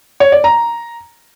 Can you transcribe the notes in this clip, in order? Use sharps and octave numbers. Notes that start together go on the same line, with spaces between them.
C#5
D5
A#5